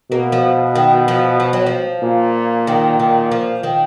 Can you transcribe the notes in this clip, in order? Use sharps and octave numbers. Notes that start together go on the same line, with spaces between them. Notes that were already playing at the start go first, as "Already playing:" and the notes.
B2 A#3
F3
D#3
F3
F3
F#3
F3
A#2
D#3
D#3
F3
D#3